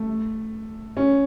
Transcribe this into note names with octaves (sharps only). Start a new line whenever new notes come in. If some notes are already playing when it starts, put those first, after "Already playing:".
Already playing: A3
C#4